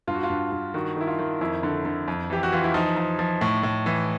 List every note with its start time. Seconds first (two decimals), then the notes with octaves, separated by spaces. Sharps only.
0.07 G2 F4
0.15 F#4
0.23 F4
0.30 G2
0.52 G2
0.74 D#3 F#4
0.96 D#3 E4
1.07 F4
1.19 D#3
1.41 F2 E4
1.63 D3
1.85 D3
2.08 F2
2.30 E3 G4
2.43 F#4
2.52 E3 F4
2.64 E4
2.74 F3 D#4
2.97 F3
3.19 F3
3.41 A2
3.63 A2
3.86 E3